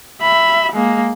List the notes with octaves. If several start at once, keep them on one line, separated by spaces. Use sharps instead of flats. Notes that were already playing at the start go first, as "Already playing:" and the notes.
E5 B5
G#3 A#3